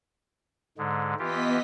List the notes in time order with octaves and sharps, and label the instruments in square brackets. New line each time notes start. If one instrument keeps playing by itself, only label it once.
[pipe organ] G#2 D3 G#3
[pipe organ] E3 F4 G4 [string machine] B3 D#5 B6